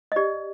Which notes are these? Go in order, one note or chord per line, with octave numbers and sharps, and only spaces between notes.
D#5
G4 D5